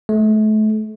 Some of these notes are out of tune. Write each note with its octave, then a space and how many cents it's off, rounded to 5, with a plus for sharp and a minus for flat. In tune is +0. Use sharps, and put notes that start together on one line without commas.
A3 -35